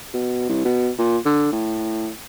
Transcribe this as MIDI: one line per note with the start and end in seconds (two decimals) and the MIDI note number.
0.14 0.48 47
0.49 0.64 36
0.65 0.90 47
0.98 1.18 46
1.25 1.51 50
1.52 2.10 45